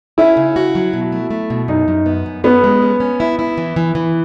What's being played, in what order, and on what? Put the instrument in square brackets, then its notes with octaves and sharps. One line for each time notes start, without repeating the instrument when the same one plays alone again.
[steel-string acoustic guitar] C#4 [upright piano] E4
[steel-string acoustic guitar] C#3
F#4
F#3
B2
A3
A3
B2
[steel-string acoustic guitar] F#2 [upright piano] D#4
[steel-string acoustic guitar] F#2
B3
F#2
[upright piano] B3 [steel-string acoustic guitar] C#4
[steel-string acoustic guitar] G#3
C#4
C#4
E4
E4
E3
E3
E3